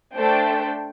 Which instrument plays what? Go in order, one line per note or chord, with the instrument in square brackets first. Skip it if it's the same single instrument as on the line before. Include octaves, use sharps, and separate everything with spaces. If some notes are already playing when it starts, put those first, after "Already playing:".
[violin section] A3 D4 A4 C5 G5